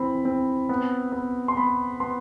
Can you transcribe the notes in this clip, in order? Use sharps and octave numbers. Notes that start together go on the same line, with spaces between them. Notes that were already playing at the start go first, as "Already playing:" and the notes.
Already playing: E3 C4 B5
C4
B3
B3
C6
B3 B5
B3 C6